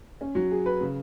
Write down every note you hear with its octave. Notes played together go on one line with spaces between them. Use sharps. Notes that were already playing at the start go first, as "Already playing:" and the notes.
C#4
F#3
G#4
B4
C#3